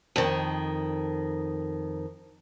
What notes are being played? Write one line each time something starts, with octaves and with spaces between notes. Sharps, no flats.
F2 D#3